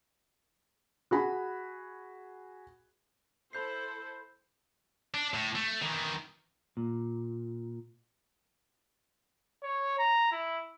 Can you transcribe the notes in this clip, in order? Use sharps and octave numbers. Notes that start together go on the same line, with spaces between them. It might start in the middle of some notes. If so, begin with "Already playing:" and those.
F#4 G#4 B5
E4 A4 C5 B5 G6 C7
D4
A2
A3
D#3 E3
A#2
C#5
A#5
E4